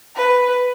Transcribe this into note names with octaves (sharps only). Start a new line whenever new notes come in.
B4